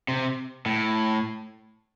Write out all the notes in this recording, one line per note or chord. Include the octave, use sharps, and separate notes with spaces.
C3
A2